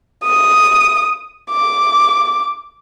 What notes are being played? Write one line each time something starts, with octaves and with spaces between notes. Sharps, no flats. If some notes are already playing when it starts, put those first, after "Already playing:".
D#6
D6